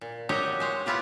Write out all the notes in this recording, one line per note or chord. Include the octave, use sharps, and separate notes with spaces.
A#2
A#2 F#3 D#4 G4 C#5 D#5
G#3 C5 C#5
B3 E4 F4 G4 G#4